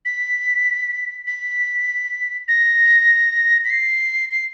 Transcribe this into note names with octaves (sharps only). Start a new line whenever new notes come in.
B6
B6
A#6
B6
C7
C7